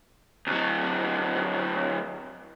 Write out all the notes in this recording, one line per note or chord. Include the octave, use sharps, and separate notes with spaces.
D2 F#3